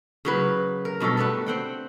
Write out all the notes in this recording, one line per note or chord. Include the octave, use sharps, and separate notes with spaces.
C#3 F#3 B4
A#4
G2 B2 G4 A4
A3 B3 D4 B4
C4 F#5 G5